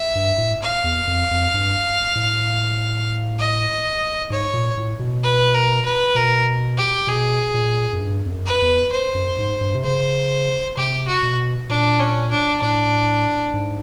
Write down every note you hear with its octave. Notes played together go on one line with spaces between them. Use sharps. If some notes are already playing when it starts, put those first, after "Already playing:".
Already playing: E5
G2
A2
F5
E2
F2
F2
G2
A2
D#5
G#2 C#5
A#2
A2
B2
B4
A#4
B4
B2 A#4
G4
B2 G#4
A#2
F#2
G2
F2
F#2
B4
E2
C5
F#2
G#2
G2
C3
C#3 C5
C3 G4
F#4
B2
A#2 D4
C#4
D4
A2 D4
G#2